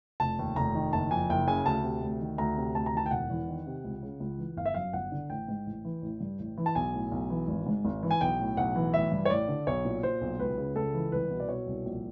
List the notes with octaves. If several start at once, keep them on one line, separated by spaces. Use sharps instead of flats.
F1 A5
D#2
F1 A#5
D#3
F#1 A5
F2 G#5
F#1 G5
C#3 G#5
D2 A5
C3
D2
D#3
D2 A#5
C3
D2 A5
A#5
D#3 A5
G5
E1 F#5
E2
D#3
C3
C#2
C#3
C#2
E3
G1 F5
E5
F#2 F5
G1 F#5
D3
A1 G5
G#2
A1
E3
A1
G2
A1
E3
A5
B1 G#5
A2
B1
E3
G#1
G#2
G#1
E3
G#5
B1 G5
A2
B1 F#5
E3
A1 E5
G2
C#5
A1 D5
D3
B1 C#5
A#2
A#2 C5
B1
C#2 B4
C#3
C#2 A4
E3
C2 B4
B2
D5
B2 C#5
C2
A#1